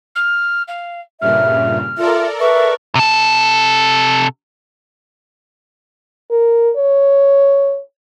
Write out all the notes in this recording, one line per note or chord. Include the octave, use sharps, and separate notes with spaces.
F6
F5
G2 A#2 C#3 E5 F6
F4 A4 A#4 D5 E5
B4 E5 C#6
C3 A4
A#4
C#5